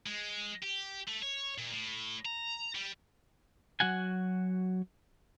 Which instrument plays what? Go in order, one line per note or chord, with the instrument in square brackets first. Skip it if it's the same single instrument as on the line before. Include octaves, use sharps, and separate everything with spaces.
[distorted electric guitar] G#3
G4
A3
C#5
A#2
A2
A#5
G3
[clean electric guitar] F#3 F#4 F#5 G#5